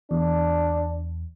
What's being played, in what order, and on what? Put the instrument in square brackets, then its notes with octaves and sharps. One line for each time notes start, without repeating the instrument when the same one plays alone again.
[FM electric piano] E2 [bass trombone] D4